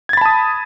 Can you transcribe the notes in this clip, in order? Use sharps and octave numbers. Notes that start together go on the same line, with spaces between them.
A5 B5 D#6 G#6 A6